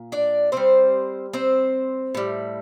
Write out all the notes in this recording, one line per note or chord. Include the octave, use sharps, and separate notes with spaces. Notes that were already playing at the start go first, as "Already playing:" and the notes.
Already playing: A#2
D4 D5
D3 G3 C4 C5
C4 C5
A2 G3